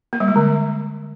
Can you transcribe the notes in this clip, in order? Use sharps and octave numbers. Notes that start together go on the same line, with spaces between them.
A#3
G3
G#3
D3